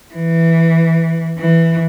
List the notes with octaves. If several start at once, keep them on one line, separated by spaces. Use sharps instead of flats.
E3
E3